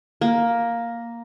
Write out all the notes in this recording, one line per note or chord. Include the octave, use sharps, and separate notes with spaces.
A#3